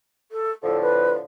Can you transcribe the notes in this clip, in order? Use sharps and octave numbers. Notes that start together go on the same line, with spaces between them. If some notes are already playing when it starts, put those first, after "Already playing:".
A4
A2 D3 F3 A4
B4